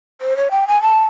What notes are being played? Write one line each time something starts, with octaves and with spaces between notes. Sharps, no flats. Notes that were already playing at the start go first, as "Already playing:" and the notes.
C5
C#5
G5
G#5
A5